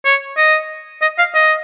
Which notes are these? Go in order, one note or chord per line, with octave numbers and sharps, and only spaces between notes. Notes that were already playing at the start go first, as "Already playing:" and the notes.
C#5
D#5
D#5
F5
D#5